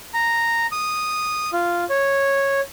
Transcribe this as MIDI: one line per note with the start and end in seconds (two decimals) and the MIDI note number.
0.14 0.66 82
0.72 1.50 87
1.53 1.84 65
1.90 2.61 73